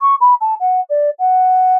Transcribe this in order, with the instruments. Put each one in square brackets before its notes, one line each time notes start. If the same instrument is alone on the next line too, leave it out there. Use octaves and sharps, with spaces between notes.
[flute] C#6
B5
A5
F#5
D5
F#5